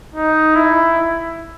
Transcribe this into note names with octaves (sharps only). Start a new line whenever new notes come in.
D#4
E4